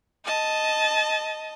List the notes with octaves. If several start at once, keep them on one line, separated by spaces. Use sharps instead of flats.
D#5 A5